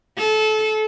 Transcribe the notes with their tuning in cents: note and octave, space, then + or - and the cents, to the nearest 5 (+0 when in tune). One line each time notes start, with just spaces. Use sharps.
A4 -25